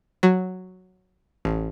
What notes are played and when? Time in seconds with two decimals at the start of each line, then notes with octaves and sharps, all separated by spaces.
0.23 F#3
1.45 A1